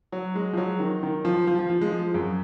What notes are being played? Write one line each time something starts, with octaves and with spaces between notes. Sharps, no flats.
F#3
G#3
F3
F#3
D#3
D#3
F3
F3
F3
F3
G#3
F3
F#2